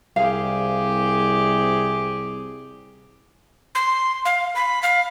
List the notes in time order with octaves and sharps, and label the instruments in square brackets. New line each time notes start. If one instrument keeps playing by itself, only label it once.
[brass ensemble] C2 [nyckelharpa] G4 G#4 [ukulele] F5
[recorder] C6
F5
B5
F5